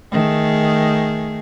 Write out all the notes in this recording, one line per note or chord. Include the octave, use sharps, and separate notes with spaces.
D#3 A3 G#4